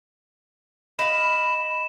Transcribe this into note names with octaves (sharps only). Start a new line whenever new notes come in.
D#5 F5 B5 E7